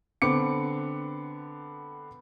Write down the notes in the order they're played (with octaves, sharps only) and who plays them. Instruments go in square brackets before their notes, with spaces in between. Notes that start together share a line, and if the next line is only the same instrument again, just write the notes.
[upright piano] D3 B3 C4 D6 C#7